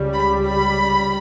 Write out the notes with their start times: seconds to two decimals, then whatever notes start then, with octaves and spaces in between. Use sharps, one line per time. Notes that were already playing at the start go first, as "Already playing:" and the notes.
Already playing: C#2 C#3 G3
0.13 B5
0.48 B5